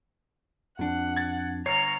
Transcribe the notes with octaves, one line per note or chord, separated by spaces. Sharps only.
F2 D4 F#5
G#6 A6
G1 C#5 A#5 F6 C7